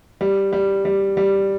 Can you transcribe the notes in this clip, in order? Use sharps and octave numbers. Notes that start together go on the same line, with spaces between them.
G3
G3
G3
G3